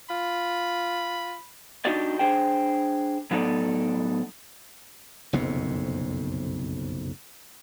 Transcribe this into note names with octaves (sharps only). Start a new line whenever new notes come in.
F4 B5
D4 D#4 F#4 G4 D5 D#5
D4 G#4 C5 G5
A2 F#3 B3 D#4 A4 D5
F#1 B1 F2 C3